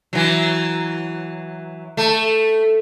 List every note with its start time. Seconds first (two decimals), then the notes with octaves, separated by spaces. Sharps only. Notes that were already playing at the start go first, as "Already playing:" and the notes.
0.13 E3 F#3
1.97 A3